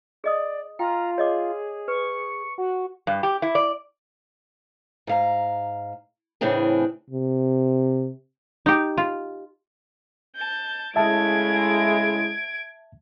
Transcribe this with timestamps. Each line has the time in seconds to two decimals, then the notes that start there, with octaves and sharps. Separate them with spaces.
0.24 G#4 D5 D#5 D#6
0.79 F4 G5 A#5
1.18 G#4 C#5 D#5 D6
1.88 B4 C#6
2.58 F#4
3.07 G2
3.23 G4
3.42 E4
3.55 D5
5.07 G#2 F5 A#5
6.41 A2 C#3 E3 C4 D4 G#4
7.10 C3
8.66 D#4 G4
8.97 F4
10.36 A5 G6
10.96 C#3 G#3 A3 E4 E5 A5 G#6 D7